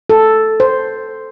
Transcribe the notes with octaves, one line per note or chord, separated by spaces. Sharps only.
A4
C5